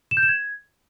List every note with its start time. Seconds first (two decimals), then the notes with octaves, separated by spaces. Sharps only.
0.11 E7
0.17 G6
0.23 E7
0.28 G#6